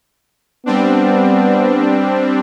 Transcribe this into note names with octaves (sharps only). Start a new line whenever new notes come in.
G3 B3 C4 D4